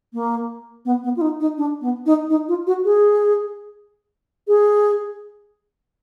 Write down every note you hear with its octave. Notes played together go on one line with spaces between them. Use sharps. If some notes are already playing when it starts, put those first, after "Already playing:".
A#3
B3
B3
F4
D#4
D#4
D4
B3
D#4
D#4
F4
F#4
G#4
G#4